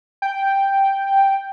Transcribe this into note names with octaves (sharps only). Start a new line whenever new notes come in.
G5